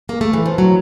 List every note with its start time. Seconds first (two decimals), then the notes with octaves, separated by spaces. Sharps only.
0.09 A#3
0.21 A3
0.33 E3
0.46 F3
0.58 F#3